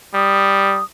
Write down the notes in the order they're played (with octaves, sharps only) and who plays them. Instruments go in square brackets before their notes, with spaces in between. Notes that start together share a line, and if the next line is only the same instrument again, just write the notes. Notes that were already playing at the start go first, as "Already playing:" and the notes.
[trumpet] G3 [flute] D#6